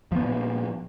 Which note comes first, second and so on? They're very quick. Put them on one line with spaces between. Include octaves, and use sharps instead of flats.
F3 B3 A#2